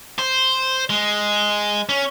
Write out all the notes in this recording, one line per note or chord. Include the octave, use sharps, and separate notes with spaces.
C5
G#3
C#4